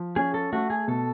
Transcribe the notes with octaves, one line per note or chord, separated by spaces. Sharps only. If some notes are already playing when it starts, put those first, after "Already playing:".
Already playing: F3
C#4 G#4
A4
A3 F#4
G#4
B2 A4